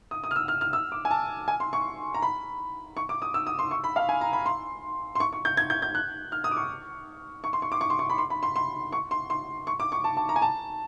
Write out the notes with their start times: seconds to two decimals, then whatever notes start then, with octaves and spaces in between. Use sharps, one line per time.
0.11 D#6
0.24 D#6
0.31 F6
0.36 E6
0.48 F6
0.61 F6
0.73 E6
0.92 D6
1.05 G#5
1.11 A5
1.48 G#5
1.60 C6
1.73 C#6
2.14 A#5
2.22 B5
2.97 C#6
3.09 D6
3.22 D#6
3.34 E6
3.47 D#6
3.59 C6
3.71 C#6
3.84 B5
3.96 F5
4.09 G#5
4.21 A#5
4.33 B5
4.46 C6
5.15 C6
5.20 C#6
5.33 C#6
5.45 G6
5.57 G#6
5.70 G6
5.82 G6
5.95 F#6
6.32 F6
6.44 D#6
6.51 D6
6.57 C#6
7.44 C#6
7.53 C6
7.62 C#6
7.72 D6
7.81 C#6
7.90 C6
7.99 C#6
8.10 B5
8.18 C6
8.30 B5
8.43 C6
8.56 C6
8.92 C#6
9.11 C6
9.30 C6
9.67 C#6
9.80 D6
9.92 C#6
10.04 A5
10.17 A5
10.29 A#5
10.36 G#5
10.42 A5